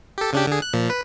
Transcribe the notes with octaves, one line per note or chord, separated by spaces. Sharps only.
G4 A4
C#3 D4 G4
D3 G#4
F#6
A#2 F3
B4